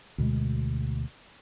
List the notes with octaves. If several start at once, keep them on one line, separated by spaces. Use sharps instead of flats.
D2 B2 G#3